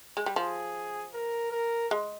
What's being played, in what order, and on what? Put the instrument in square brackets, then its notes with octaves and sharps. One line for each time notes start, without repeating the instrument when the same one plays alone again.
[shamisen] G#3
G3
[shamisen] F3 [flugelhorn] G#4
[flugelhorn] A#4
A#4
[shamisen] G#3